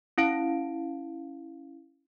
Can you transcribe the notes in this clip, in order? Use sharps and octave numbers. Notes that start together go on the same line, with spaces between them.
C#4 E4 F5 D7